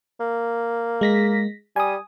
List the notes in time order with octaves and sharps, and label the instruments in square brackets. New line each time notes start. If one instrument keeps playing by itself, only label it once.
[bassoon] A#3
[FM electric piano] G#3 A#6 B6
[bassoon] G3 [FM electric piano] G#5 D#6